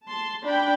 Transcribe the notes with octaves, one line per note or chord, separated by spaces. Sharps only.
A5 C6
D4 G5 B5